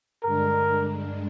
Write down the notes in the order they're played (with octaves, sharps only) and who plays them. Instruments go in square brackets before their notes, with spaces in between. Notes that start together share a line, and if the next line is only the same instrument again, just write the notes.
[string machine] G2 D3 G#3 D4 [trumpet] A#4